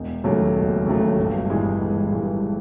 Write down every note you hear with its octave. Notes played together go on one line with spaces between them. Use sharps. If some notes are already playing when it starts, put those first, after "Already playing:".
Already playing: E1
D#2 C#3 F#3 A3
E1
D#2 C#3 F#3 A3
G1
G2 E3 G#3
G1
G2 E3 G#3